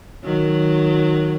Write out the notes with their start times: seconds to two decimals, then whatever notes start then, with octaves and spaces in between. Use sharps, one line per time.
0.23 D#3 F#3